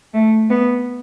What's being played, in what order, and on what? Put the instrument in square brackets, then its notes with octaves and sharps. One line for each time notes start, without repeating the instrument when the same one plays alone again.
[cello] A3
B3